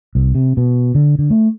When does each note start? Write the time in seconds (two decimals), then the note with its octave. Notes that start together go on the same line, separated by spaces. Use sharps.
0.15 C2
0.35 C3
0.57 B2
0.95 D3
1.19 D3
1.30 A3